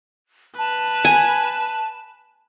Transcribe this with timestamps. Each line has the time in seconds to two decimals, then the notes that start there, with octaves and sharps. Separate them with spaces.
0.58 B4 A5
1.05 G#5